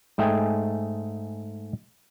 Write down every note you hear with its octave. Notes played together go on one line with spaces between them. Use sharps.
G#2 A3 G#4 D#5 G5 G#5